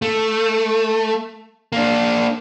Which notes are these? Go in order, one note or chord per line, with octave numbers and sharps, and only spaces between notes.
A3
A#3 D4